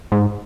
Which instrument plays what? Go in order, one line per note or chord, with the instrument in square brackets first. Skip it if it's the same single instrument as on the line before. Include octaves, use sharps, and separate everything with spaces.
[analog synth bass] G#2